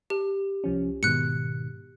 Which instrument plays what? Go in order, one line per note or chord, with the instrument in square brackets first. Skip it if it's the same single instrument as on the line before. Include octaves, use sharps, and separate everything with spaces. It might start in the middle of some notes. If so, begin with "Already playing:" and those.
[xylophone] G4
[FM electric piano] C2 F3 C#4
[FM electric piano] G#2 B2 D#3 [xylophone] F#6 C#7